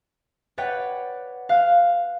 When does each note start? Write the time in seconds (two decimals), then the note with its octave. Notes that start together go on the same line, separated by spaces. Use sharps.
0.58 B4 C#5 D5 F#5 G5
1.49 F5 F#6